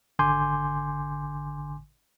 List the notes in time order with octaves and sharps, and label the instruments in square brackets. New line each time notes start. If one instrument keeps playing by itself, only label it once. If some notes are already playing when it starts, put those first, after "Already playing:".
[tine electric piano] G#1 D3 G#5 C6 D6 G6